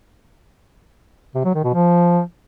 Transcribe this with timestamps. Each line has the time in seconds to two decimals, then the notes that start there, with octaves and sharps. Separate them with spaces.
1.35 C3
1.45 F#3
1.54 D#3
1.64 B2
1.74 F3